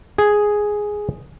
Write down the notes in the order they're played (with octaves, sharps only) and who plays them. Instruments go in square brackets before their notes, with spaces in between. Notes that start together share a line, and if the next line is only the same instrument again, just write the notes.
[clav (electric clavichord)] G#4